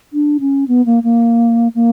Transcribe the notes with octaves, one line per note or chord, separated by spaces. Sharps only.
D4
C#4
B3
A#3
A#3
A#3